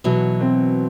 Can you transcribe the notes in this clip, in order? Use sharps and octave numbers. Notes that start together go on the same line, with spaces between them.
B2 E3 F#3
C4